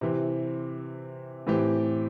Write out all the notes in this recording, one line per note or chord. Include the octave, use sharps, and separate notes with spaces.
C3 E3 C4
A2 E3 C4 G4